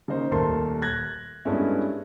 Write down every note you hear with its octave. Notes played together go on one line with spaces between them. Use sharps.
C#3 A#3 D#4 C5
D#1 D#2 A3 A#4 A5 C6
F#6 G#6 A#6
G2 G#3 A3 B3 C#4 E4